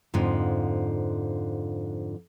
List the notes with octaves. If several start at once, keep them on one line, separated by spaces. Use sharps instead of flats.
F2 G#2 D3 F3